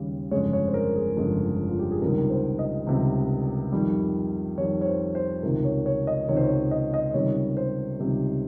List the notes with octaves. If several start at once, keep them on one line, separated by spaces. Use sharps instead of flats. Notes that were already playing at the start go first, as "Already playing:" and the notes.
Already playing: D#2 C#3 G3
G1 F2 C#3 G#3 C#5
C#5
C5
A#4
G#4
G1 F2 C#3 G#3
F4
G4
G#4
C#2 C3 D#3 G3 A#4
C5
D#5
C#2 C3 D#3 G3
F2 D#3 G3
F2 D#3 G3 C#5
C#5
C5
C5
C#2 C3 D#3 A#4
C#5
C#5
D#5
C#2 C3 D#3 C#5
C5
C#5
D#5
D#5
C#2 C3 D#3 G3 C#5
C5
C#2 C3 D#3 G3